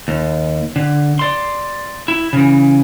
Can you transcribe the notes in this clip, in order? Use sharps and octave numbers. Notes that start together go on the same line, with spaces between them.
D#2
D3
D5 C6
E4
C#3 E3